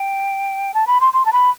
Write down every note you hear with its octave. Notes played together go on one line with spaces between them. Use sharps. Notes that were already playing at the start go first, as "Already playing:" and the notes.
Already playing: G5
A5
B5
C6
C6
A5
B5